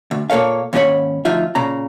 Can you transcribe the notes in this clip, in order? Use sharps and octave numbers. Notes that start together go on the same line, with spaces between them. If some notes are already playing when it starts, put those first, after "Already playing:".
D2
A#2 A#3 A4 C#5 F5
D#2 G#2 C#4 G4 C#5 B5
D2 F3 D#4 F4 E5
A#2 C#3 A#5